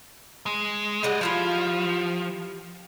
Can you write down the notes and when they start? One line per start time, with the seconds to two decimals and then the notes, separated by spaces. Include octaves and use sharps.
0.46 G#3
1.03 G3 G#3 D5 D#5 F#5
1.21 F3 E4 F4 G4